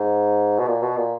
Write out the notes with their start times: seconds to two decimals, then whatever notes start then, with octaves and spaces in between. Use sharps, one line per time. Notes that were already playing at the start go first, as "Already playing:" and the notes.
Already playing: G#2
0.59 B2
0.68 A#2
0.82 B2
0.97 A#2